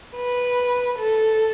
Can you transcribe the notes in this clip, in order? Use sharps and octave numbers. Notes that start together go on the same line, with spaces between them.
B4
A4